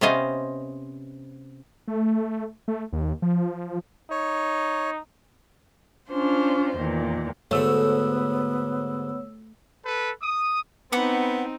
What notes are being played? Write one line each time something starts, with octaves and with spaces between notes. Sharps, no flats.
C3 B3 C#4 C5 D#5 F5
A3
A3
D#2
F3
D#4 C#5
C#4 D4 F4 C5
E2 A#2 D#3
D2 G#2 D3 A3 B3 C#5 E6
A4 B4
D#6
B3 C4 D#4 F#5 B5 D6